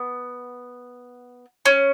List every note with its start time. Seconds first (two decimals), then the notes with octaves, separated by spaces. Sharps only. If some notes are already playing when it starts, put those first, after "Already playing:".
Already playing: B3
1.66 C#4